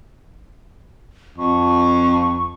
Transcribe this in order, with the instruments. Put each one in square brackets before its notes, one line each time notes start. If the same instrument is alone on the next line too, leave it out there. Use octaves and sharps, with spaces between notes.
[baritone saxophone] F2 [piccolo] C#6